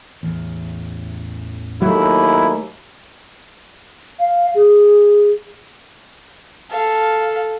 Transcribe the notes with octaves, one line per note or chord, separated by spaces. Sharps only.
A1 E2
D#2 F#3 A3 E4
F5
G#4
A4 F5